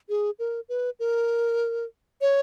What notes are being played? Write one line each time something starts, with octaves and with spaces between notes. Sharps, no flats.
G#4
A#4
B4
A#4
C#5